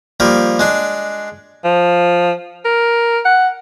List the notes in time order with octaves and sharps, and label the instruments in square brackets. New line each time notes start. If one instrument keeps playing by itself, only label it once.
[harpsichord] F3 G3 A#3
G#3 D4
[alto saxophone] F3
A#4
F#5